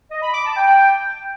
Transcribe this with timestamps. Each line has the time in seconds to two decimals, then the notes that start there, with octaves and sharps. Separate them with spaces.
0.11 D#5
0.23 B5
0.34 D6
0.45 A5
0.57 G5